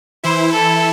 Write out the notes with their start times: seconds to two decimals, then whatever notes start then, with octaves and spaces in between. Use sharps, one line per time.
0.23 E3 E4 C5
0.52 A4